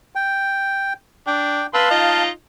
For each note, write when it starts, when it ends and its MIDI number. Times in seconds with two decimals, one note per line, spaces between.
0.15 0.93 79
1.27 1.62 62
1.27 1.67 79
1.74 1.86 71
1.74 2.23 77
1.74 2.23 81
1.74 1.86 84
1.74 1.86 88
1.91 2.29 63
1.91 2.29 65
1.91 2.29 75